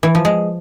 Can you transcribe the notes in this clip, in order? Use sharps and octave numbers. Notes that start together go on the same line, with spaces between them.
E3
F3
G#3